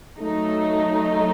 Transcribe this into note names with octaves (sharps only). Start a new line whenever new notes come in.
F#3 A3 D#4